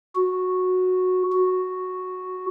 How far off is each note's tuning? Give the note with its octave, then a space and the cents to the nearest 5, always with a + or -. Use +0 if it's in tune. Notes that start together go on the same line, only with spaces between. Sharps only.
F#4 -10
F#4 -5